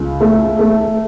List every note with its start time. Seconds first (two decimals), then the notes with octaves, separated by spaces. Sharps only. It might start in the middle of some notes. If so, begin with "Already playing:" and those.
Already playing: C#2
0.21 A3
0.59 A3